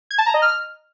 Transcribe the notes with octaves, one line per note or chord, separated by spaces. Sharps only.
G#6
A5
A#5
D#5
F6